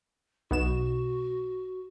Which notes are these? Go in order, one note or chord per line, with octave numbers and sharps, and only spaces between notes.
B1 B2 F#4 E7